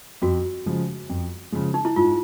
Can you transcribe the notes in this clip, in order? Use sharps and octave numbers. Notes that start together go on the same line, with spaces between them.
F2 F#4
C#3 F3 G#3
F2
C#3 F3 G#3
D#4
E4
G#2 F4